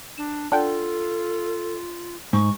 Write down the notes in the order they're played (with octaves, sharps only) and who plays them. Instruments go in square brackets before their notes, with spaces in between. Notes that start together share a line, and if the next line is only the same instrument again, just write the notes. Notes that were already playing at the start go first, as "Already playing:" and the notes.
[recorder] D4 [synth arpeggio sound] E7
[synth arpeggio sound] D4 F#5 G5 [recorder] F4 [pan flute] A4
[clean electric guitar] G#2 [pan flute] C#6